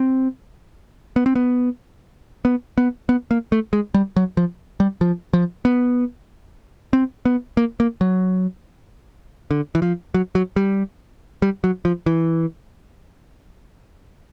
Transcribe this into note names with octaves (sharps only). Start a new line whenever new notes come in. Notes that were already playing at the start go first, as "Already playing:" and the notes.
Already playing: C4
B3
C4
B3
B3
B3
B3
A#3
A3
G#3
G3
F#3
F3
G3
F3
F3
B3
C4
B3
A#3
A#3
F#3
D3
E3
F3
F#3
F#3
G3
G3
F#3
F3
E3